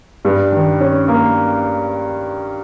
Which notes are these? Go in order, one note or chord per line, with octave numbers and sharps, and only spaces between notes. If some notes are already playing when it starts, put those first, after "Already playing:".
G2
D#3
C#4
A#3